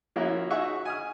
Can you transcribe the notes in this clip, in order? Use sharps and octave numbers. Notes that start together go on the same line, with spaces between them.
F3 A#3 C#4 E4 F#4 E5
D#4 F#4 G#4 E5 F#5 C#6
G#5 D#6 F6